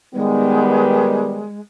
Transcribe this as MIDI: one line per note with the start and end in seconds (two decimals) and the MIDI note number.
0.15 1.45 51
0.15 1.45 55
0.15 1.60 56
0.15 1.45 59